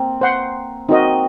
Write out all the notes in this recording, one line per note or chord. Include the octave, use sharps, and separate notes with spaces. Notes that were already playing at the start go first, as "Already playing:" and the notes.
Already playing: A#3 C4
C5 F#5 C6
C4 D#4 F#4 A#4 D#5